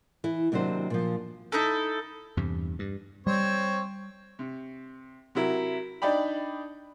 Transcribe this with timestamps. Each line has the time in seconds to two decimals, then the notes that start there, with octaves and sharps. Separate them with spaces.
0.24 E3 E4
0.52 D#2 C3 F#3 D4 C5
0.90 A#2 F3
1.52 D#4 E4 A4
2.37 E2 G2 C3
2.79 G2
3.27 G3 C4 C5 C#5
4.39 C3
5.35 C3 F#3 E4 A#4
6.02 D4 D#4 D5 G5 B5